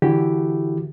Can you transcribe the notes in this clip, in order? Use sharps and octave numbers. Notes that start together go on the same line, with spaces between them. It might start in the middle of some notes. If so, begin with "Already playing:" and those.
D3 E3 E4 F#4 G4